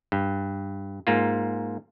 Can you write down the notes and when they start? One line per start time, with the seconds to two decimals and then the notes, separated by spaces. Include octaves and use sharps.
0.12 G2
1.07 G#2 A#3 F4